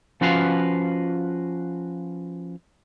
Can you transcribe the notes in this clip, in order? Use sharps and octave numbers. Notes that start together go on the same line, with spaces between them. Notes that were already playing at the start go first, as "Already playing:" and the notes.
F3 C#4 F4 F#4 B4 F5